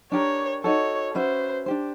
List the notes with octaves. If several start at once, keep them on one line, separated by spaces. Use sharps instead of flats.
D4 G4 A#4 C#5
D#4 F#4 A4 C#5
C#4 F#4 B4 C5 E5
D4 G4 C5